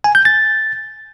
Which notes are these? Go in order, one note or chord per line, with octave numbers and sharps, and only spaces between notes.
G#5
G6
A6